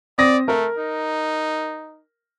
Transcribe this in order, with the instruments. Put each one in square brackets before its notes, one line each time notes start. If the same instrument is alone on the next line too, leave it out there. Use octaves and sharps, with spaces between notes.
[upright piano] C4 D#6 A#6 [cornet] D5
[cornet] A3 [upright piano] A#4
[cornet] D#4